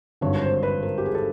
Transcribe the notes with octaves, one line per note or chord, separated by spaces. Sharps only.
G#1 G2 D3 C#5
C5
B4
A#4
G4
G#4
A4